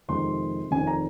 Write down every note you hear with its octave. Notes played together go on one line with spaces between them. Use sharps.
F2 C3 D#3 G#3 C6
F1 F2 D#3 G#5
A#5